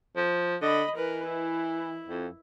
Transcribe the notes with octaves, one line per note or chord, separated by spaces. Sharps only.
F3
D3 D#5 B5
E3 A#4 B4
E4
F2